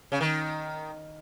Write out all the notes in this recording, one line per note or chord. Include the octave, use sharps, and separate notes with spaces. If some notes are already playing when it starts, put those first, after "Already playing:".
C#3
D#3